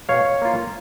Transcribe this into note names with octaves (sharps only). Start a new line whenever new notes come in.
B2 C#5 F5
A#3 F4